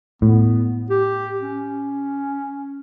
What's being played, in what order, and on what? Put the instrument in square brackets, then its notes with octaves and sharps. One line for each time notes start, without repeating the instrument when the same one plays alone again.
[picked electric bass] A2 [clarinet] B3
[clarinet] G4
C#4